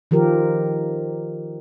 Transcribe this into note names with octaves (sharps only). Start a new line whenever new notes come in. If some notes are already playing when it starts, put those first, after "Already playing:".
D#3 F3 G4 A#4